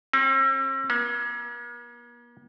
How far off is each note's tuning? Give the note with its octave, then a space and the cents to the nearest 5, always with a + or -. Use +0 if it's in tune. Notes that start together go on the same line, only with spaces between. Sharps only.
C4 +45 G4 +0
A#3 +45 E4 +0